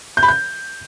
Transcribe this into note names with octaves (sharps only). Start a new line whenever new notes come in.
G6
B5
G6